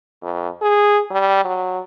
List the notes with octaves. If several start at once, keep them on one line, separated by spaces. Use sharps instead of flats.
F2
G#4
G3
F#3